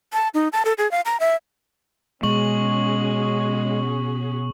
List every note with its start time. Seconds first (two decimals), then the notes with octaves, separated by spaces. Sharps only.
0.13 A5
0.34 D#4
0.53 A5
0.65 A4
0.78 G#4
0.91 F5
1.05 A#5
1.20 E5
2.23 B2 G#3 C#4 F#4 G#4 C#6 F#7